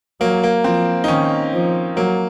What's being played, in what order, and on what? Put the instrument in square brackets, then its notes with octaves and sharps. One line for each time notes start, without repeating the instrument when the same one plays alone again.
[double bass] F#3 [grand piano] A#3
[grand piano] A#3
[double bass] F3 [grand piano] C4
[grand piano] D#4
[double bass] D#3 [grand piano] C#4
[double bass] F3
[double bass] F#3 [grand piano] A#3